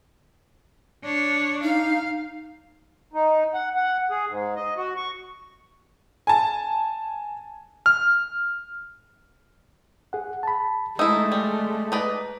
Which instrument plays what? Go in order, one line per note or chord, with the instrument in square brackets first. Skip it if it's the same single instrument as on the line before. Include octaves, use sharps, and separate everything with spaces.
[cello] D4 C#5
[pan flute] D#4 [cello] F5
[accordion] D#4
F#5
F#5
G#4
G#2
D#5
F#4
C#6
[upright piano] G#5 A5
[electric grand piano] F6
[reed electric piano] G#4 F#5
A5 B5
[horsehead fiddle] G#3 A3 [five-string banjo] D#4 E4 [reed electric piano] E5 D#6 E6
[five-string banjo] G3
D#4 B4 D5